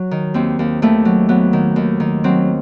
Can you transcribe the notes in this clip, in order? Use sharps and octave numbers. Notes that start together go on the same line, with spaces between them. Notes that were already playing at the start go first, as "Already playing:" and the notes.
Already playing: F#3
D#3
D#2 C4
D#2
D#2 A3
F#3
F#3 B3
D#3
D#2
D#3
F#3 C4